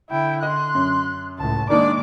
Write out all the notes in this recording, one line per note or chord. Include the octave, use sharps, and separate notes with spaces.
D3 E4 G5
D#5 C6 F#6
F#2
C#2 A2 A5
D#3 G#3 A#3 D4 D#4 D5 D6